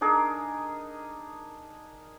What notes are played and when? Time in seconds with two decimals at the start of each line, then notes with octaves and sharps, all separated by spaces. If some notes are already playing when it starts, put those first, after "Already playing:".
0.01 D4 D#4 G#4 A#4